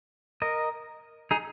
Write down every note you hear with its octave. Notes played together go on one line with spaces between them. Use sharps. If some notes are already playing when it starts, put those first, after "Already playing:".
A#4 D#5
D#4 G#4